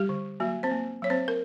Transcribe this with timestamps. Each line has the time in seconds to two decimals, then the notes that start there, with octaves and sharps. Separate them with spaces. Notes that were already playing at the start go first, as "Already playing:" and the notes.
Already playing: G3 G4
0.09 D3
0.40 F#3 A#3 F#4
0.63 C4 C5
0.71 A#3
1.02 F#3 C#5
1.10 C4 C5
1.28 A#4